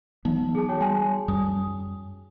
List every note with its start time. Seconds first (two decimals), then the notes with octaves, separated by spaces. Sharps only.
0.25 E3 F#3 B3 D#4
0.55 G#4 A4 A5
0.69 F#4 C#5 G5
0.81 G3 G5 G#5 C6
1.28 F#2 G3 D#6